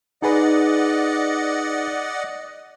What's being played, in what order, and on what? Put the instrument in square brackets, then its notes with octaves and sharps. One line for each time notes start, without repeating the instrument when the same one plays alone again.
[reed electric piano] D#4 G#4 B4 [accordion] D5 D#5 F#5